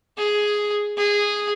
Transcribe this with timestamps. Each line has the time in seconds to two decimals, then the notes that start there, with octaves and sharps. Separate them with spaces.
0.18 G#4
0.97 G#4